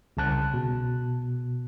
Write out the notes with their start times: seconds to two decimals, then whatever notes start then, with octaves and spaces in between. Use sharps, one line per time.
0.17 C2 C#3 A5 F#6
0.54 B2